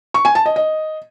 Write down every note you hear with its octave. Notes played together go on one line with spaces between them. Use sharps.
C#6
G#5
A5
D#5
D#5